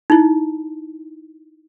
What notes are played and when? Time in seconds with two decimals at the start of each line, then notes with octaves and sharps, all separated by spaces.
0.10 D#4 E4